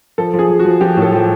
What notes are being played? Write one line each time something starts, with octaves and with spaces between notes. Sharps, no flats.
F3 A4
F3
G#4
F3
F#4
F3
F3 G4
A2
A4
F3